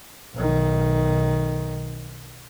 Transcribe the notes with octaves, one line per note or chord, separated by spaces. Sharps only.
B1 D#3